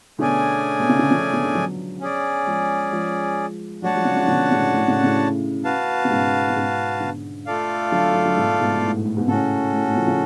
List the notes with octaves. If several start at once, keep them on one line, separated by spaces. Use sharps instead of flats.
B2 D3 A3 C#4 G#4 D5 G#5
B2
C#3
D3
C#3 F3
B2 D3
B2 D3
D3 F#3
C#4 G#4 D5
F3 G#3
F3 G#3
F#3 A3 D4 F#4 C#5 F#5 A5
F3 G#3
C#3 F3
C#3 F3
B2 D3
A2 C#3
A2
A2 C#3
A2 C#3
F#4 B4 F5 A5
C#3
G#2 B2
C#3
G#2 B2
B2 D3
A3 F4 A4 D5 F5
D3 F#3
D3 F#3
D3 F#3
G#2 B2
G#2 B2
B2
A2
A2
A2
G#2 B2
A2 C#3 C#4 F#4 A4
A2
A2
C#3 F3
C#3 F3